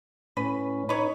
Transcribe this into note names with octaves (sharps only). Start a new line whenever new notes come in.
A2 C#4 B4
D#4 B4 C#5